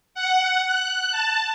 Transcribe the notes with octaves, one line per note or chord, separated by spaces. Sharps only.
F#5
F#6
A5